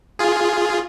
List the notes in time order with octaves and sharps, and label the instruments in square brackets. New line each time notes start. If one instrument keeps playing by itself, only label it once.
[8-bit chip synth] F4 G#4